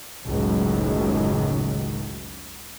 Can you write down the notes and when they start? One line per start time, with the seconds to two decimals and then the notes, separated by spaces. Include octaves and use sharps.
0.24 F#1 C#2 A2 D#3 F#3